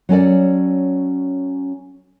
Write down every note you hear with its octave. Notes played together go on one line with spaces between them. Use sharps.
F#3 C#4 A4 D5